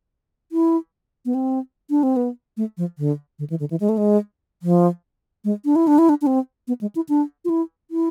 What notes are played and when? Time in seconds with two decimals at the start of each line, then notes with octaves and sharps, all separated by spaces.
0.52 E4
1.25 B3
1.34 C4
1.90 D4
2.03 C4
2.16 B3
2.57 A3
2.77 F3
2.98 D3
3.39 D3
3.50 E3
3.60 D3
3.70 E3
3.80 G#3
3.89 A3
3.97 G#3
4.62 F3
5.44 G#3
5.65 D4
5.76 E4
5.87 D4
5.98 E4
6.09 D4
6.21 D4
6.27 C4
6.68 B3
6.81 G#3
6.95 E4
7.09 D4
7.45 F4
7.49 E4
7.91 E4